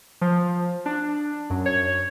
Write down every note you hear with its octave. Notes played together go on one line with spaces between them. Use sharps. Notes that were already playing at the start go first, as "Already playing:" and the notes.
F3
D4
F#2
C#5